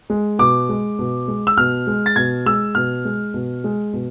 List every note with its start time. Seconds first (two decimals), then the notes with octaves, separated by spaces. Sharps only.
0.10 G#3
0.39 B2 D6
0.69 G#3
0.99 B2
1.28 G#3
1.47 E6
1.57 B2 F6
1.87 G#3
2.06 A6
2.16 B2 G#6
2.46 G#3 E6
2.75 B2 F6
3.05 G#3
3.34 B2
3.64 G#3
3.93 B2